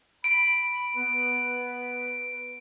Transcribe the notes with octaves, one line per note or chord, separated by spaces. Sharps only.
B5 D7
B3 B4